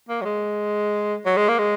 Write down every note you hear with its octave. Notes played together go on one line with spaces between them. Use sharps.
A#3
F#3
G#3
F#3
G#3
A#3
G#3